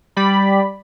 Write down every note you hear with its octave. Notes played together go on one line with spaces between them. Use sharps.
G3 D5 B5